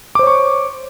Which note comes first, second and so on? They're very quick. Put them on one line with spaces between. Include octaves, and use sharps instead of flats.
D6 C5 C#5 C#6